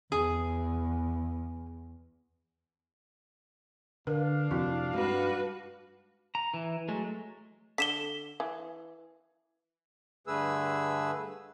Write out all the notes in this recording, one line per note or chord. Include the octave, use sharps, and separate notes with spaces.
E2 G#4
D3 D4 A#4 B4 F5
F2 C3 C4 E4 F#4
G2 G#3 D#4 F#4 B4
A#5
E3
F#3 G#3 A3
D3 B6 E7 G7
E3
G2 D3 A3 G#4 B4 E6